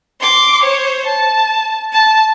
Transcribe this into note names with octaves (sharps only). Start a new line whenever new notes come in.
C6 D6
C5 C#5
A5
A5